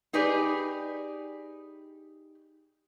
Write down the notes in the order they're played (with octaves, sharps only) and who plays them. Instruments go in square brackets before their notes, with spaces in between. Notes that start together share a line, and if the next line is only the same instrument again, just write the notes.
[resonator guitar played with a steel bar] D#4 G4 G#4 B4 D5